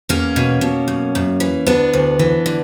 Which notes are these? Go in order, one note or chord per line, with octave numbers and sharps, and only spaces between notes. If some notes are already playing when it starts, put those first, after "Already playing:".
E2 A#3 C#4
B2
B2
F#2
F#2
E3
D2 B3 D4
D2
E3
D3